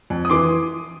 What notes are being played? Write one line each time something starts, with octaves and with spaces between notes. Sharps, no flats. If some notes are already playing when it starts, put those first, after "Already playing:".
F2
D#6
E3 C6 D6